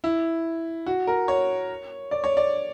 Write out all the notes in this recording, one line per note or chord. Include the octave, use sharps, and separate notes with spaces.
E4
F#4
A#4
C#5
D5
C#5
D5